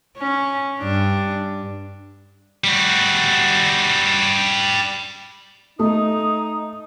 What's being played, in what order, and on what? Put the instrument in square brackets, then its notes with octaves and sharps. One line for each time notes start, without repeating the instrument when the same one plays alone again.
[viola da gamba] C#4
G2 D4
[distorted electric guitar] G3 F#4
[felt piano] A3 [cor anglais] D#4 [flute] D#6